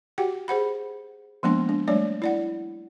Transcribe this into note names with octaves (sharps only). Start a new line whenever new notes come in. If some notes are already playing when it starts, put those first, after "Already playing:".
F#4 G4 F#5 G5
G#4 C5 F#5 B5
F3 G#3 A#3 B3 D4 C6
D4
G3 A3 D4 C#5 D5
E4 D5 F#5